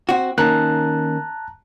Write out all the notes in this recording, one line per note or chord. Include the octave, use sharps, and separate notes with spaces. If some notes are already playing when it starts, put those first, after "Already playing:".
C4 F#4
D#3 A#3 C#4 A5 A#5 F#6